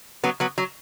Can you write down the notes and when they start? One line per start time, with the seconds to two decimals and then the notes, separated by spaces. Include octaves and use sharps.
0.24 F#3 B3
0.40 F#3 B3
0.58 F#3